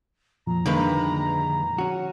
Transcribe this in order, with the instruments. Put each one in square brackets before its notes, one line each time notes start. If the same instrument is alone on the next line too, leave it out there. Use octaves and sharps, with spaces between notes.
[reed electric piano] F2 A#2 F3 [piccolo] A#5
[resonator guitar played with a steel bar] G2 D#3 B4 [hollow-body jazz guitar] D3 G#3 A#3
[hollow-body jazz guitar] C#4 F#4